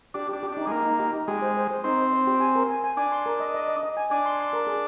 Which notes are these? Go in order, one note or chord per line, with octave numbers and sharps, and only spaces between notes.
D4 G4
D4 G4
G4
D4 D#4
G#3
A#3 D#4
D#4
G4
D#4
G#3 G4
C5
C5
C5
C4 D#4
C5
C5
G4
G#5
A#4
G#5
G#5
D4 G#5
C6
A#4
D#5
D#5
D#5
D#5
G#5
D4 G#5
C6
C6
A#4
G#4